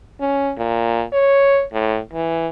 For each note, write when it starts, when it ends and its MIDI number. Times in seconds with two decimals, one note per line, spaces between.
0.20 0.52 61
0.58 1.04 46
1.13 1.64 73
1.73 1.99 45
2.13 2.48 52